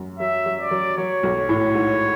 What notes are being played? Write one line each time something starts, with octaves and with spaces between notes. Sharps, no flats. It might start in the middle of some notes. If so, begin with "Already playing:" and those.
Already playing: F#2
F#3 E5
F#3
D5
F#3
F#3 C#5
B1
A2
G#2